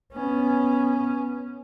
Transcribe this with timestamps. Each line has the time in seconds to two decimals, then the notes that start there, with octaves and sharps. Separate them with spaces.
0.13 B3 C#4